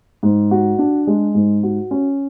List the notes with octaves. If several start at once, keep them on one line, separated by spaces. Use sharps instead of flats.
G#2
F#4
D4
G#3
G#2
F#4
C#4